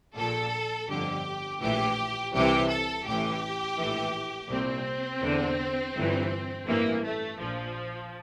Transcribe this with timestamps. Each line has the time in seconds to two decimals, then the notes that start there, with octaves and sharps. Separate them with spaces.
0.16 A#1 A#2 A4
0.88 G1 F2 D3 G4
1.61 A#1 A2 E3 G4
2.33 C2 C3 E3 G4
2.69 A4
3.05 A1 A2 E3 G4
3.77 A#1 A2 E3
4.50 C2 A#2 C4
5.21 E2 D3
5.95 G1 G2 E3
6.66 A1 G2 E3 A#3
7.03 A3
7.39 A#1 A#2 F3